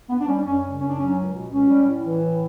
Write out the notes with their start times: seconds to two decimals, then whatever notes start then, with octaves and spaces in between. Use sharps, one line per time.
0.09 G2 B3
0.21 D4
0.27 G3 C#4
0.45 F#2 C#4
0.63 C#3
0.80 F#2 C#4
0.89 D4
0.98 F#3 C#4
1.16 C#2
1.34 B2
1.51 C#2 C#4
1.69 G3
1.87 A2
2.04 E3
2.22 A2